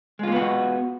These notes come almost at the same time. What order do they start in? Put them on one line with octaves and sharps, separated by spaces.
G#3 F4 A#3 B3 F#4